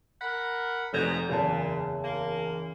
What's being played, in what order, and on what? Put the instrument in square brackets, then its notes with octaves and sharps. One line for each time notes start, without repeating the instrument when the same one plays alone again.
[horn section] A#4 F#5 B5
[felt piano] F1 G6 G#6 [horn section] G#2 B2 A#5
[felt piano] F#1 E2 A5 [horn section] A#2
[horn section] A#3